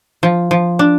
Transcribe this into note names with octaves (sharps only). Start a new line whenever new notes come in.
F3
F3
D4